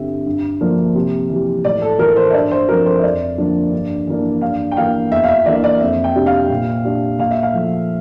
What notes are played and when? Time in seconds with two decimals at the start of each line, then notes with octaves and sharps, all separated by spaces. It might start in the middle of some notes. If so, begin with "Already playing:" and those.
Already playing: G2 D3 G3 C4 E5
0.26 G2
0.61 D3 F3 A#3 D4
0.95 C3
1.30 E3 G3
1.65 A2 D5
1.82 A4
1.99 E3 A3 A#4
2.16 C5
2.30 E5
2.34 G2 D5
2.51 C5
2.69 F3 C4 A#4
2.86 C5
2.99 E5
3.03 F2 D5
3.38 D3 F3 A#3 D4
3.72 G2
4.07 E3 A#3 D4
4.41 G2 F5
4.71 G5
4.77 E3 A#3 D4 F5
5.11 E2 E5
5.24 F5
5.29 E5
5.46 E3 A#3 D4 D5
5.56 E5
5.64 D5
5.81 F2 E5
6.04 G5
6.15 C3 G3 D4
6.26 F5
6.50 A#2
6.85 G3 D4
7.19 A#2 F5
7.31 E5
7.43 F5
7.54 F3 A3